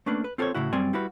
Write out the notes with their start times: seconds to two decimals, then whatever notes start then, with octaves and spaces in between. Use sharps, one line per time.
0.06 A3 A#3 C#4 D4 B4
0.24 B4
0.38 C4 F4 A4 A#4 C5 C#5
0.55 A2 C#3 E4 F#4
0.73 F#2 G3 C4 D5 G#5
0.93 G3 E4 F#4 B4